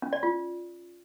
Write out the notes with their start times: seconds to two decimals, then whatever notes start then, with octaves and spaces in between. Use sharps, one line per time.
0.02 C#4
0.13 D5
0.23 F4